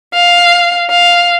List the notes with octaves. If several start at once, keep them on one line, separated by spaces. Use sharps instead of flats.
F5
F5